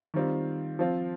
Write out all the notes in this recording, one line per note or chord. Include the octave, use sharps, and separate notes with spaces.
D#3 G3 C4 F4
F3 C4 F4